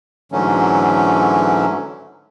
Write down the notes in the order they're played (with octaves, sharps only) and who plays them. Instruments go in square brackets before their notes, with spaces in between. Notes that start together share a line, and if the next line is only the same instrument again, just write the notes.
[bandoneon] G#2 D3 E3 F#3 A3 C#4